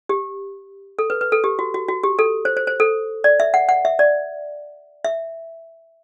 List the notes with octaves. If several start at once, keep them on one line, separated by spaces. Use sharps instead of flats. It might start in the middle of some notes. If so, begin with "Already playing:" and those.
G4
A4
B4
B4
A4
G4
F#4
F#4
F#4
G4
A4
C5
C5
C5
A4
D5
E5
F#5
F#5
E5
D5
E5